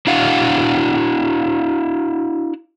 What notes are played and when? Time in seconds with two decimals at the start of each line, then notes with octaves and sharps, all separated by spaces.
0.07 D4 E4 F#4 F5 F#5